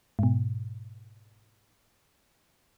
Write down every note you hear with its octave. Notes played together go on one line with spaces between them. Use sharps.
G#2 B2